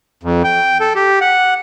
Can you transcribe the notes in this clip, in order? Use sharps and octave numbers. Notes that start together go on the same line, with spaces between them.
F2
G5
A4
G4
F#5